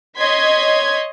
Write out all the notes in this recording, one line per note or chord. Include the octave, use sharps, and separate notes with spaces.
C#5 D#5 C6 G#6 B6